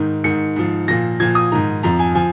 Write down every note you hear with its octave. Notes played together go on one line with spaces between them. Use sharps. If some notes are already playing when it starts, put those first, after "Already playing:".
Already playing: G#2 D#3
G#2 D#3 C#7
G#2 F3
A#2 F3 A#6
A#2 F3 G#6
D#6
G#2 D#3 A#5
F2 F3 A#5
G#5
F3 G#5